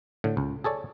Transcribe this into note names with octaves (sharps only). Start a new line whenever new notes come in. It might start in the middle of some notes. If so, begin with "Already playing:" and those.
A2 D3
C#2
G#4 A4 C#5 D5